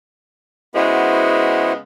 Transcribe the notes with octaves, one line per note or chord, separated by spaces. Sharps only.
C#3 G#3 B3 E4 F#4 C5